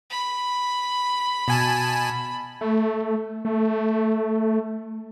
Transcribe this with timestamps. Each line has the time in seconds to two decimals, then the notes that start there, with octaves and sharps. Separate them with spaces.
0.10 B5
1.48 B2 G#5 A5
2.61 A3
3.45 A3